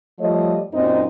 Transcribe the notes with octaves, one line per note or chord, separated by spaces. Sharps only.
F3 G3 A3 C#5 D#5
F#2 A#2 C4 D#4